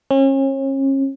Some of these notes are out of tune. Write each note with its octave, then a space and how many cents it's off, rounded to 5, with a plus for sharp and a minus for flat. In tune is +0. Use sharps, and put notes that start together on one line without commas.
C#4 -35